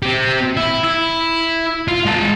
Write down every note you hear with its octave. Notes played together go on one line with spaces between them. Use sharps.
C4 G4
E4
E4
F4
G#3 A5